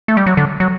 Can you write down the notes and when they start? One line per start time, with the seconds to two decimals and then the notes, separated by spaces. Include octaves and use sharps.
0.08 A3
0.17 G3
0.27 F#3
0.37 D3
0.60 F#3